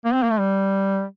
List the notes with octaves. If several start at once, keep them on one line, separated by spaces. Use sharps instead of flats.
A#3
C4
A#3
A3
G3